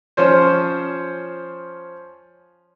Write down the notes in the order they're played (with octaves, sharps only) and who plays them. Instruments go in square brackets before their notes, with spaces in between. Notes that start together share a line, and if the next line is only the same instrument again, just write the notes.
[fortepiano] F3 C#4 C5